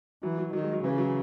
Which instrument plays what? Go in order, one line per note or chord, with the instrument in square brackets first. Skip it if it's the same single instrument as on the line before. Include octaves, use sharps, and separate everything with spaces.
[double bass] E3 [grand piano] F#3
[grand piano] F#3
[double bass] D#3 [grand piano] F#3
[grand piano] G#3
F#3
[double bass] C#3 [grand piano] E3
[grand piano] F#3